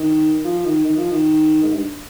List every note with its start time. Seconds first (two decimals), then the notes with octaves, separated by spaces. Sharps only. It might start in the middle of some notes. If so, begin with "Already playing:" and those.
Already playing: D#3
0.45 F3
0.65 D#3
0.85 D#3
0.97 F3
1.11 D#3
1.63 G#2
1.73 G2